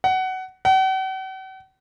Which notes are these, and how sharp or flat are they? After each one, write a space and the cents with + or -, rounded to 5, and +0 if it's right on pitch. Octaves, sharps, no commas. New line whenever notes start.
F#5 +20
F#5 +45